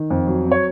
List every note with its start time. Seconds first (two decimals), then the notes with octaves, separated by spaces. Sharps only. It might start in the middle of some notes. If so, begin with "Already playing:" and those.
Already playing: D#3
0.10 F2
0.27 F#3
0.46 C4
0.51 C#5